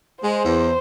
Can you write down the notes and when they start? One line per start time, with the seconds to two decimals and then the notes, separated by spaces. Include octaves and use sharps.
0.23 G#3 C5
0.45 E2